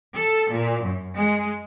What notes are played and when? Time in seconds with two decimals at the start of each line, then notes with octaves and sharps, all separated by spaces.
0.16 A4
0.53 A#2
0.84 F#2
1.16 G#3